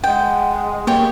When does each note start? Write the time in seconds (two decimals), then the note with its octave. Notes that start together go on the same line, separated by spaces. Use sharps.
0.04 G#3 F#5 G5
0.87 A#3 G4 C#5 G5